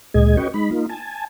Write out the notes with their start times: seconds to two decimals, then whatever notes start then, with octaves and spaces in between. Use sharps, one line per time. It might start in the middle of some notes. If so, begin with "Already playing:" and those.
0.14 D2 A#2 G#3 G#4 D#5 G#6
0.37 C#4 F#4 B4 D#5 G5 C#6
0.54 G#3 D#4 B5
0.71 A#3 D#4 F4
0.89 G#5 A5